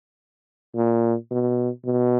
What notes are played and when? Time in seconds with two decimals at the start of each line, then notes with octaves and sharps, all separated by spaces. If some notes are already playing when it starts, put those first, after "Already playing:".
0.76 A#2
1.31 B2
1.85 B2